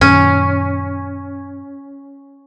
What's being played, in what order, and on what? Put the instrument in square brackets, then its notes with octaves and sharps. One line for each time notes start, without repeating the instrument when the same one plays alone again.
[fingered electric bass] F#2 A#2 D#3 [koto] C#4